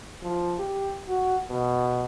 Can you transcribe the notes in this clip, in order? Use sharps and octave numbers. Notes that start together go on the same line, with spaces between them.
F3
G4
F#4
B2